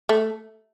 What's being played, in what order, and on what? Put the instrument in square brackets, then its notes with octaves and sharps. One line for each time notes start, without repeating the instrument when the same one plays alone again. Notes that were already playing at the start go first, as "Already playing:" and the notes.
[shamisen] A3